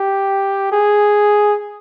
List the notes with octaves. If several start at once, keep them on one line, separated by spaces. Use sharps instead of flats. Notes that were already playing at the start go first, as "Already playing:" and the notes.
Already playing: G4
G#4